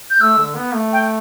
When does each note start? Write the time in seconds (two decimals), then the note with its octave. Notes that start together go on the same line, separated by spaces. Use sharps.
0.10 G6
0.20 A3 E6
0.38 D3
0.56 B3
0.75 A3
0.93 G5